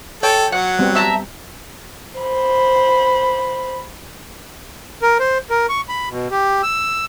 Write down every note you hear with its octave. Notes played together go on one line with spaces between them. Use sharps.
A4 C#5 G5
F#3 F#5
G3 B3 C4
E5 A5 A#5
C5 B5
A#4
C5
A#4
C#6
B5
B2
G4
E6